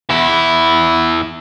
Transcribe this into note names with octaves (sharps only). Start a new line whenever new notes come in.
E2 E4